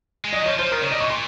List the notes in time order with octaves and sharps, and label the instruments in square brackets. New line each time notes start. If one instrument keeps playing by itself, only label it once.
[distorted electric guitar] G#3
[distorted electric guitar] F#3 [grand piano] D#5
[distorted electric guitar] D#3
[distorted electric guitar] F3 [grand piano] C#5
[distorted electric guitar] F3 [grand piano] C5
[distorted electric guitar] D#3 [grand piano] A#4
[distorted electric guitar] C#3 [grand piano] C#5
[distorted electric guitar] C3 [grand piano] D#5
[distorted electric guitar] A#2 [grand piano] C#6
[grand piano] C6